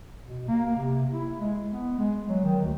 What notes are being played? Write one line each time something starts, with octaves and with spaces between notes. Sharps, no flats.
B2
A#3
C3
E4
G#3
B3
G#3
F#3
D#3
D2